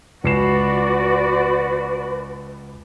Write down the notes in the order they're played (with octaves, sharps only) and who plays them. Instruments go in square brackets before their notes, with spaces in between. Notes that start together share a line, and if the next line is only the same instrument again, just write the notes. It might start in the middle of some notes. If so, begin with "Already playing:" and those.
[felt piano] C#2 C7 E7 [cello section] F#4 D5 [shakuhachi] B4